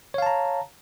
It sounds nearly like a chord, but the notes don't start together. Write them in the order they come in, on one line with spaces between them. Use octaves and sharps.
C#5 F5 A5 A#5